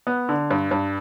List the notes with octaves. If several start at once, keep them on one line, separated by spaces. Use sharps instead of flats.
B3
D3
G2
G2